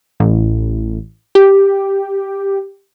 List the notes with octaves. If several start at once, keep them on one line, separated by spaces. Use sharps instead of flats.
A1
G4